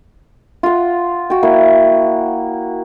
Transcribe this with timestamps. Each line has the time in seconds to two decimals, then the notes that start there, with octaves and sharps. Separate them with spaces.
0.63 F4 F#5
1.30 F#4 G5
1.43 A#3 E4